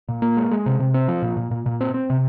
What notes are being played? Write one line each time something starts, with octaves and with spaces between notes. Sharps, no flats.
A#2
A#3
G#3
G#3
C3
C3
C4
F3
A#2
A#2
A#2
A#2
C4
C4
C3